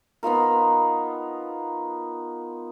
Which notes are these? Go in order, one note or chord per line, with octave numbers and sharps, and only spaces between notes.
B3 D#4 F4 A#4